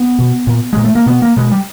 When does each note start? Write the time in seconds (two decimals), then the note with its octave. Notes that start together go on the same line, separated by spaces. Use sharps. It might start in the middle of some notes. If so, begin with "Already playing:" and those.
Already playing: B3
0.19 B2
0.47 A#2
0.73 A#2 G#3
0.84 A3
0.95 A#3
1.06 B2 B3
1.22 A#3
1.37 B2 G#3
1.52 G3